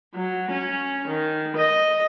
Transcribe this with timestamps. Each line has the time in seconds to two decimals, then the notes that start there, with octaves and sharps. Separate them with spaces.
0.14 F#3
0.51 C#4
1.07 D#3
1.57 D#5